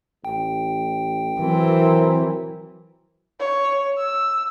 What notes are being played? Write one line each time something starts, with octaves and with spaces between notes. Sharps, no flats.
A1 G5
E3 F#3 C4 A#4
C#5
E6